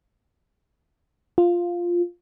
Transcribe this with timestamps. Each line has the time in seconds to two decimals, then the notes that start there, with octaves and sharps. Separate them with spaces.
1.38 F4